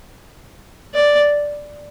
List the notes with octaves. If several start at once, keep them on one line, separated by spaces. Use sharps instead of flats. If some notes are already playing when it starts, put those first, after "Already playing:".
D5